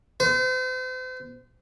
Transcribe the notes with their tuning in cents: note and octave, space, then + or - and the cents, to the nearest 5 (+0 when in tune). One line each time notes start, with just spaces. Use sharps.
C5 -40